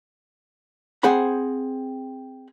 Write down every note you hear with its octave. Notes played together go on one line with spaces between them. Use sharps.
C4 G#4 C5 F#5 B5